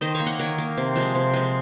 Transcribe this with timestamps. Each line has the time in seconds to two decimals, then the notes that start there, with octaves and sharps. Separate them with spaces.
0.01 D#3 C5 D#5
0.15 C#5 F5
0.20 A#3
0.26 D#5 F#5
0.39 D#3 A#4 C#5
0.58 A#3
0.77 C3
0.96 F3 G#3
1.15 C3
1.33 F3 G#3